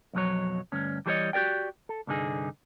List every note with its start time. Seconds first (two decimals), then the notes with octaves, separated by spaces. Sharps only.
0.13 B1 F2 C#3 F#3 C#5
0.72 D2 G2 C#4
1.06 E3 G3 G#4 C5 C#5 D#5
1.33 F#4 G4 A#4 D5 G5
1.89 A4
2.07 C2 G2 D3 D#4 G#4